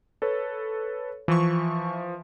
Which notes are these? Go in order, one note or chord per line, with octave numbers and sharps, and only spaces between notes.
A4 B4 C#5
E3 F3 C#6